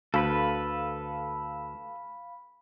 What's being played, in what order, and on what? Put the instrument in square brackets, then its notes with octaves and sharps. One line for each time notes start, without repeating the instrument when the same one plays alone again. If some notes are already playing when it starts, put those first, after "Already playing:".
[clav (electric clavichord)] D2 [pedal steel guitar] A4 B4 [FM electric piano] F5 B5